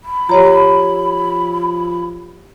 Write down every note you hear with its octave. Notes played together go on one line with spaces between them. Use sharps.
B5
F3 G4 C#5 A#5